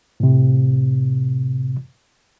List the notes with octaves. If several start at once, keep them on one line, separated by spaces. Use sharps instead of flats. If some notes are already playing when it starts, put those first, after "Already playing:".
A2 C3